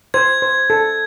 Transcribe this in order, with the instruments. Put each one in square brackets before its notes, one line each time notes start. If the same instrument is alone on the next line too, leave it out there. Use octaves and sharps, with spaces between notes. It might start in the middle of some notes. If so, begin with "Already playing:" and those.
[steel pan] C5 [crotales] G#6
[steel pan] C5
A4